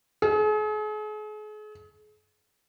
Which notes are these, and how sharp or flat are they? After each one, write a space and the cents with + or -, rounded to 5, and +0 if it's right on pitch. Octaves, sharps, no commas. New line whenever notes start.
G#4 +40